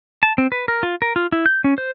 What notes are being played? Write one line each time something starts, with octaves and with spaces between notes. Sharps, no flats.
A5
C4
B4
A#4
F4
A#4
F4
E4
G6
C#4
C5